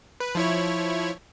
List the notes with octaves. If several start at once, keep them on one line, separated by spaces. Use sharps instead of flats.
B4
F3 E4 C#5